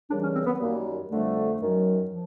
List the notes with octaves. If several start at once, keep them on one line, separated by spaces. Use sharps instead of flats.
D#2 C#3 E3 G3 D4
C#4
C4
B3
F#2 D#3 G3 A#3
F2 D3 G3 A3
F#2 D#3 F#3
F3